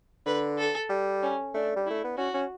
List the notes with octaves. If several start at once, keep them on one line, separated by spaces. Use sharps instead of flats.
D3 B4
A4
G3
C#4
A3 D4
G3
A3 E4
B3
C#4 F#4
C#4